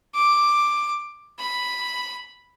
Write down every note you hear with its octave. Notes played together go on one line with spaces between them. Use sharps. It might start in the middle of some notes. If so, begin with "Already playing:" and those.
D6
B5